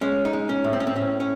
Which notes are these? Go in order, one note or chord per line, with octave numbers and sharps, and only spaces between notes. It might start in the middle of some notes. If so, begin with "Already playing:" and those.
G#3 C#4
D#4
G#3
C#4
A2
C4
C#4
C4
A2 C#4
C#4